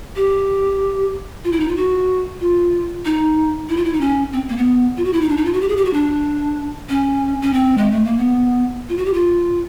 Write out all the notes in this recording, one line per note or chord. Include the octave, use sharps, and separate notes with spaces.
G4
F4
E4
D#4
F4
F#4
F4
D#4
E4
F4
E4
D#4
C#4
C4
A#3
B3
F4
F#4
E4
D#4
D4
D#4
F4
F#4
G4
G#4
G4
F#4
D4
C#4
C#4
C4
G#3
A3
A#3
B3
F4
F#4
G4
F4